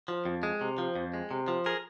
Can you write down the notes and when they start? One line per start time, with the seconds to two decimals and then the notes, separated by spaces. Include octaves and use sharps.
0.08 F3
0.25 F2
0.43 G#3
0.61 C3
0.78 F3
0.95 F2
1.14 G#3
1.31 C3
1.48 F3
1.66 G#4 A#4